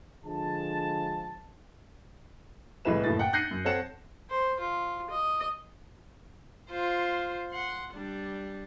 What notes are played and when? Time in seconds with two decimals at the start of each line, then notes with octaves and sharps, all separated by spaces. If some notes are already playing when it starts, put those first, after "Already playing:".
0.24 D3 F3 G#3 A5
2.85 C2 A2 G#3 B4 E7
3.04 F#1 A2 A6
3.19 F#5 G5
3.33 F#6 G6 A#6 C7 C#7 D#7
3.51 F#2
3.65 C4 A4 C#5 F#5 E7
4.30 C5
4.60 F4
5.10 D#5
6.70 F4 C5
7.51 F#5 C6
7.94 G3 D4